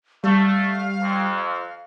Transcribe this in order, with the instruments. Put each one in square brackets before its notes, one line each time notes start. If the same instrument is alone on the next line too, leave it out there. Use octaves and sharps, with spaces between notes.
[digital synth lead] G3 [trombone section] A3 [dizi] F5
[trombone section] F2